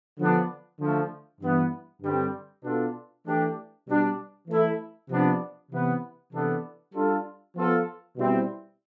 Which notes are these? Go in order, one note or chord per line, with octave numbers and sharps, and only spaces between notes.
D3 F3 B3 D4
D3 F3 A3
G2 E3 B3
G2 D3 G3 C4 G4
B2 B3 D4 F4 A4
E3 A3 D4 G4
B2 G3 D4
E3 A3 E4 A4
C3 F3 B3 D4
C3 E3 B3
C3 E3 B3 D4 A4
G3 D4 F4 A4
F3 B3 F4 A4
B2 G3 C4 E4